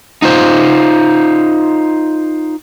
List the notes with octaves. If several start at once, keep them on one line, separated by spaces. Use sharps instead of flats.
D#4 F4 C5